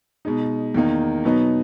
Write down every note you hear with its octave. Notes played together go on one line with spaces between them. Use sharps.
B2 G#3 D#4
E2 D#3 A#3 D#4
B2 F#3 B3 D#4